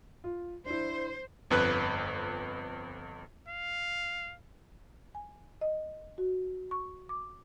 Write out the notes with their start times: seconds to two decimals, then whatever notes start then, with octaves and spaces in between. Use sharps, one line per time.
0.24 F4
0.66 D4 E4 C5
1.50 G1 F2 B4 F#6
3.48 F5
5.15 G#5
5.61 D#5
6.18 F#4
6.71 C#6
7.09 D6